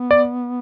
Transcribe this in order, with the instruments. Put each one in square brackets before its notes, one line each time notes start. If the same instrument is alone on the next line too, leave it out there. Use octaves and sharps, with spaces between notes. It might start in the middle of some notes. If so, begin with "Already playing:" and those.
Already playing: [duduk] B3
[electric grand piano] D5